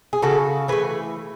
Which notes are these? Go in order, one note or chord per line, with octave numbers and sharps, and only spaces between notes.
G#4
C#3 F#4 A4
E3 A3 G#4 B4